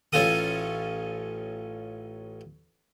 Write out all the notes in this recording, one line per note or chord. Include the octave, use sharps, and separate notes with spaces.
A1 C#4 F4 A4 D#6